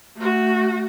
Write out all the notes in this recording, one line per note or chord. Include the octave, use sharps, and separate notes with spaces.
A3 F#4